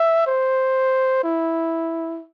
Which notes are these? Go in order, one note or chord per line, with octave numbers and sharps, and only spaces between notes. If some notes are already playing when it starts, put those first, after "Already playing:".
Already playing: E5
C5
E4